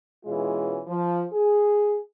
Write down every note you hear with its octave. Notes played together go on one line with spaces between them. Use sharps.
B2 E3 G#3 C#4 F4 G#4
F3
G#4